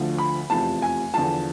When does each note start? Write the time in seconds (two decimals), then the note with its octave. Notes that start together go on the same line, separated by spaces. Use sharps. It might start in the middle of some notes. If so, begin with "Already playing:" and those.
Already playing: D2 D3 F3
0.18 B5
0.50 F1 E2 C3 F3 A5
0.82 G#5
1.14 E2 D3 F3 A5